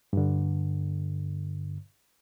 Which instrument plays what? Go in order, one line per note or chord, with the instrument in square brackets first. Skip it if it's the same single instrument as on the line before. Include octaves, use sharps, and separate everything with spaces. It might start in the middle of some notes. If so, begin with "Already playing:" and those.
[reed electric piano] G2 D3